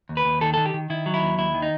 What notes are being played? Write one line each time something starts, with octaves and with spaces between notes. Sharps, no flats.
D#2
B4
D#2
D#3 A4
D#3 A4
G4
D#3
D#3 E4
F#3
E4
D#2
D#2 E4
D#3
D#4